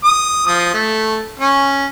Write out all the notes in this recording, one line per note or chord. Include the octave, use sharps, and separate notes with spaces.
D#6
F3 D#6
A3
C#4